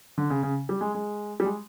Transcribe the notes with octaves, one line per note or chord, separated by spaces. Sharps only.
D3
C#3
C#3
G3
G#3
G#3
G3
G#3